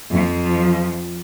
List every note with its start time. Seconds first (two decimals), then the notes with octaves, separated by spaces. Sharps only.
0.11 F2 F3